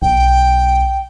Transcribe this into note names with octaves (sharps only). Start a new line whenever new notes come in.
B1 G5